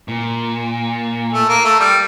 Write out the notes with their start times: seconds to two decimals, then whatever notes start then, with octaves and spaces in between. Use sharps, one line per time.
0.08 A#2
1.33 A3
1.49 A#3
1.65 A3
1.80 G3